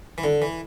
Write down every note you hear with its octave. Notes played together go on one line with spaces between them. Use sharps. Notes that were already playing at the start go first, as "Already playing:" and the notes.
E3
D3
E3